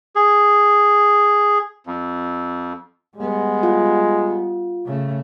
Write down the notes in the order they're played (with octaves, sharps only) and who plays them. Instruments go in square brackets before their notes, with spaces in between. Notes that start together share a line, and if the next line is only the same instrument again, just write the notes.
[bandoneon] G#4
F2
[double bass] G3 B3 [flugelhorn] G#3
[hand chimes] F4
[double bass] C#3 A3